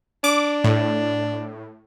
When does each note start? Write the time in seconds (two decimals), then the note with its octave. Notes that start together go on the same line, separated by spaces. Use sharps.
0.24 D4 D6
0.64 A2